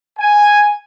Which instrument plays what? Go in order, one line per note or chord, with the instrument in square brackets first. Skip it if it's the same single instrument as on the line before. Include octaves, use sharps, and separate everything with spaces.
[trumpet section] G#5